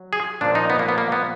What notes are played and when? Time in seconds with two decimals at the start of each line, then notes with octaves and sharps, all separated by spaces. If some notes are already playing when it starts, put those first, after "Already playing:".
Already playing: F#3
0.13 G#4
0.41 A#2 F3 D4
0.55 D#4
0.70 B3
0.79 A#3
0.89 B3
0.98 A#3
1.12 B3